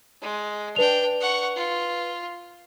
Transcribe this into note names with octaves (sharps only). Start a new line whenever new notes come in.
G#3
D4 B4 G5 F7
F#5 C#6
F4